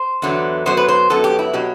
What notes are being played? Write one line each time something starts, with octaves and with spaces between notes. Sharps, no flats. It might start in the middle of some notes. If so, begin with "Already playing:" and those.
Already playing: C5
E2 D3 F#3 B3
F#2 F#3 B3 C5
B4
C5
F#2 F#3 B3 A4
G4
E4
B2 F#3 G4